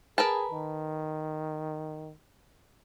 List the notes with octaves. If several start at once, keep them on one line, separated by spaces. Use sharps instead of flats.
G#4 A#4 B4 A5
D#3